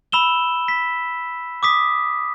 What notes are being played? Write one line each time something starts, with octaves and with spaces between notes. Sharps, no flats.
B5 E6 E7 G7
B6
D6 D#6 B6